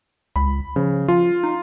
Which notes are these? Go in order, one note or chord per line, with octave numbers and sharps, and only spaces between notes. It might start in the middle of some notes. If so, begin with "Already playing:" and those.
C#2 B5
C#3 F3
F3 F4
D#4